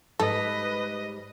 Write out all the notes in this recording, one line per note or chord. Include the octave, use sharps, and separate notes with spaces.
G#2 G3 A4 B4 D#5